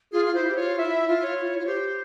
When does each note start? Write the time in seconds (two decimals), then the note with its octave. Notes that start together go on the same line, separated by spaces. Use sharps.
0.12 F4 G#4
0.25 F4
0.35 E4 C5
0.47 G4
0.57 F4 C#5
0.79 E4 E5
1.08 F4
1.24 C#5
1.37 F4
1.40 E4
1.56 F4 C#5
1.66 G4 C5